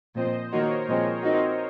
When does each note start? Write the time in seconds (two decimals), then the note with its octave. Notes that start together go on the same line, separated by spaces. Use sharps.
0.15 A#2 F3 C4 C5 D#5
0.52 D#3 A#3 D#4 F#4 A#4 C#5
0.88 A#2 F3 G#3 C4
1.23 C4 D#4 F#4